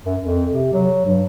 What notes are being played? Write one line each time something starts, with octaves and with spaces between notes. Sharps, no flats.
F#2
F2
C3
F#3
G2